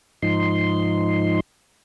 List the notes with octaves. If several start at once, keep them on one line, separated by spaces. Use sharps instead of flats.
G#2 F3 D#4 C6